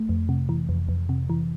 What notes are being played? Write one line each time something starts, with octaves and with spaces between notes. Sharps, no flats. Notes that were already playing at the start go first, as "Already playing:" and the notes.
Already playing: A3
F2
C3
E3
F2
F2
C3
E3